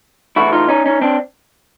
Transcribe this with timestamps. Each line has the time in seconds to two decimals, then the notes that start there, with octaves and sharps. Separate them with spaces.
0.36 C#3 E3 A3 E4 F#4
0.53 D#4 F4
0.69 C#4 D#4
0.86 C#4 D#4
1.01 C4 D4